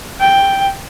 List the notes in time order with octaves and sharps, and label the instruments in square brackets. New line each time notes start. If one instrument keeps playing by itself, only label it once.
[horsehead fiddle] G5